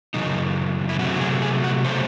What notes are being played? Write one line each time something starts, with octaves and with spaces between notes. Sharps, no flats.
F#2 C#3 E3 D#4
E4
C3 F#3 A3 F#4
F#4
G#4
G#4
F#4
C#3 F#3 A3 C5